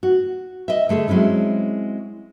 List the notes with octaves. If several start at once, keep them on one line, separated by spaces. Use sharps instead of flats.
F#4
D#5 E5
D3 A3 G#4 A4
F#3 G#3 C4 C#4 E4